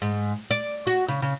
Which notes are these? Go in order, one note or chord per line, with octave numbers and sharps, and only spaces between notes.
G#2
D5
F#4
C#3
C#3